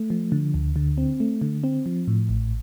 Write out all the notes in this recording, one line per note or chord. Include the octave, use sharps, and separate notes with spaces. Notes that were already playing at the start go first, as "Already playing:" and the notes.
Already playing: A3
F3
D3
D2
D3
C4
A3
D3
C4
F3
A2
A1